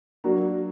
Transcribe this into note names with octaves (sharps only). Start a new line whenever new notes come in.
F#3 A#3 D4 F#4 A#4